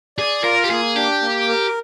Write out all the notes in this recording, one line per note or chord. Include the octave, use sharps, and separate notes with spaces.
G#4 D5
F4 A#4
G4
A#3 G#4
D4 G4
A#3
A#4